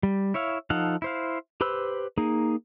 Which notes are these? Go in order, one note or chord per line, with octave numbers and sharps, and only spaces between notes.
G3
E4 C#5 E5 F5
F3 D#4 A4 F5 F#5
E4 C5 F5
G4 B4 C5 B5 E6
A#3 D#4 G#4